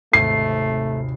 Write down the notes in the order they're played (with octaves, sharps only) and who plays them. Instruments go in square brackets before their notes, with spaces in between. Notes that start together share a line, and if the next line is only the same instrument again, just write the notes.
[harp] G#1 D#2 C3 [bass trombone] A3 [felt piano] C7